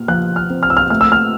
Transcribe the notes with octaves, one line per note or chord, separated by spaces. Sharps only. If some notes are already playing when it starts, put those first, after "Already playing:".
Already playing: A#2 F6
F3 F#6
F6
C4
F6
E6
F6
A3 F6
E6
F6